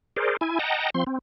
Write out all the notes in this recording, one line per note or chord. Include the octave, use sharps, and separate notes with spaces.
G#4 A#4 C5 D5
E4 G#5
D#5 F#5 G5 A5 A#5
F3 C4 C6
C4